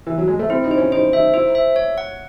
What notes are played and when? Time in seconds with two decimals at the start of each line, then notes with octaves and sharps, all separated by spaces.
0.07 E3
0.18 F#3
0.28 G#3
0.39 A3
0.50 C4 E4
0.64 D#4
0.71 C5
0.77 C#4
0.92 D#4 C5
1.13 D#4 E5
1.34 E4 C5
1.55 E5
1.76 C#5
1.98 F#5